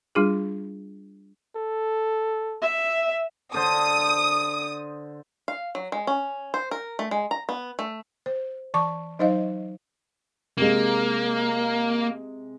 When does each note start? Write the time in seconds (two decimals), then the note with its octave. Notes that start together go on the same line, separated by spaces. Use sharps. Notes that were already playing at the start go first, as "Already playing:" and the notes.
0.15 G3 D4 F4 G#4
1.56 A4
2.61 E5
3.54 D3 C5 D#6
5.48 F5
5.75 F#3
5.92 G#3
6.07 C#4
6.54 C5
6.71 A#4
6.99 A3
7.11 G#3
7.31 A#5
7.49 B3
7.79 A3
8.26 C5
8.74 E3 A5 C#6 D6
9.19 F#3 D#4 C5 D#5 F5
10.57 C3 G#3 A#3